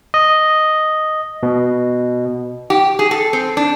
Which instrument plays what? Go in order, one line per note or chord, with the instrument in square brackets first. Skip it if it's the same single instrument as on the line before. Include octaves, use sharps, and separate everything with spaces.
[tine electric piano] D#5
B2
[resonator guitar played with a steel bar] G4
G#4
A4
C4
D4